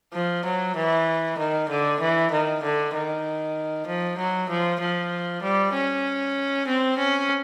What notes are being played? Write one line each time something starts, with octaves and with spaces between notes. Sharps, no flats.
F3
F#3
E3
D#3
D3
E3
D#3
D3
D#3
F3
F#3
F3
F3
G3
C#4
C4
C#4